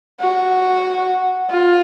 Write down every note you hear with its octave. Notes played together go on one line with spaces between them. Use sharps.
F#4
F4